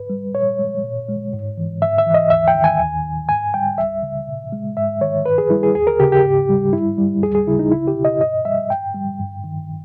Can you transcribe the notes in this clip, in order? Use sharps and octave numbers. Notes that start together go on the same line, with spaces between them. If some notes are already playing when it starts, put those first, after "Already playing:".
Already playing: G#2 B4
G3
A#2 C#5
G#3
A#2
G#3
G#2
E3
G#2 E5
E5
E3
D#5
D#2 E5
G5
D#3
G#5
D#2
D#3
G#2 G#5
G3 G5
C#2 E5
C#3
A#2
G#3
G#2 E5
D#3 C#5
G2 B4
G#4
G3 E4
G#4
D#2 G#4
A#4
C#3 G4
G4
G#2
G3
G2 E4
G3
D#2 G#4
G#4
C#3 E4
D#4
C#2 E4
G4
B2
D#5
G2 D#5
G3 E5
G2 G5
G3
G2
D#3